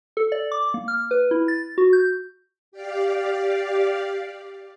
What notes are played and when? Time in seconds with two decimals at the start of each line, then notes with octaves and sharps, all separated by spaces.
0.17 A4
0.32 D5
0.52 D6
0.74 A#3
0.88 F6
1.11 B4
1.31 E4
1.48 A6
1.78 F#4
1.93 G6
2.72 G4 D5 F5